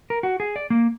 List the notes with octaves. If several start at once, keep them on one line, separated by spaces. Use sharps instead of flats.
A#4
F#4
G#4
D5
A#3